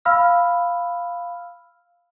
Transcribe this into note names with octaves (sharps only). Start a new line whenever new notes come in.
F5 B5 E6 F6